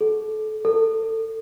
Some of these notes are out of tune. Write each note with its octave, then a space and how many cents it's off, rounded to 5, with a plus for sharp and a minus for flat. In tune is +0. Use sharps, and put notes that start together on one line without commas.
A4 -30
A4 +30